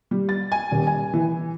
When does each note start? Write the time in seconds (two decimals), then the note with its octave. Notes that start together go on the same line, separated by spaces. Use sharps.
0.11 G3
0.29 A6
0.52 G#5
0.71 D#1
0.87 G#5
1.14 E3